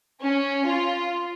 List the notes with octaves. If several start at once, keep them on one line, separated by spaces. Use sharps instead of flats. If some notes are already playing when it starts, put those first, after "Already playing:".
C#4
F4